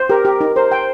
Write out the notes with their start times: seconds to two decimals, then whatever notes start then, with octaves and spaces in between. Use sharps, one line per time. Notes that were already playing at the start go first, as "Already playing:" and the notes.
Already playing: C5
0.10 G4 A#4
0.25 G4
0.41 D#4
0.56 A#4 C5
0.72 G5